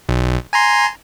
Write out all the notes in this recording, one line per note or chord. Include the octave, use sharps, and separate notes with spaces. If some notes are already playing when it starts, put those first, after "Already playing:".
B1
G#5 A#5 C6